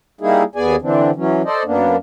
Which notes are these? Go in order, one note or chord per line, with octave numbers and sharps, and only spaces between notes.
G3 A#3 D#4 E4 G#4
D#2 B3 G#4 D5 G#5
D3 E3 C4 D4
E3 F#3 C#4
A4 C5 D5 D#5
F#2 A#3 B3 D4